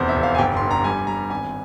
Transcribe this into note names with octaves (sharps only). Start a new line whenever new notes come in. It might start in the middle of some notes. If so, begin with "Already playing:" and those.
Already playing: F1 E2 C5
E5
F1
F5
G#5
G1 G5
C6
G2
A#5
G3 G#5
G3 A#5
G#1 G#5